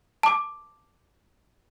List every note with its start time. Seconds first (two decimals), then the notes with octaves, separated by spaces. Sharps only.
0.23 A5 D6